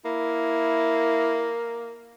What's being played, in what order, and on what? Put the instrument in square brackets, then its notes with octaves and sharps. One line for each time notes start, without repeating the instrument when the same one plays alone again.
[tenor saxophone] A#3 [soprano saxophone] E4